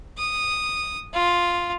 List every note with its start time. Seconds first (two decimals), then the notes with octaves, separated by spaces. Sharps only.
0.18 D#6
1.14 F4